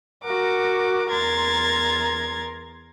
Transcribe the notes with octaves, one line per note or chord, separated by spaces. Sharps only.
F#4 A#4 F#5 D6
E2 A#4 A#5 C6 G#6 A6